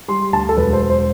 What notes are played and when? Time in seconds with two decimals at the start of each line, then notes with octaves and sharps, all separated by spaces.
0.08 G3 C6
0.33 D2 A5
0.49 A4
0.57 E1 B4
0.73 C5
0.81 E1
0.90 C5